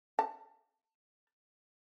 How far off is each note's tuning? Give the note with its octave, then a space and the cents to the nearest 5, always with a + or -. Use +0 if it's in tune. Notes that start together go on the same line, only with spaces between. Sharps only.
A5 +20